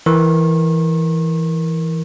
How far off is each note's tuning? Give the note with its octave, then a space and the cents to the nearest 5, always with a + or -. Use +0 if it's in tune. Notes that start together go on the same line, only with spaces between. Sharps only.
E3 +0 A#4 +0 C#6 -40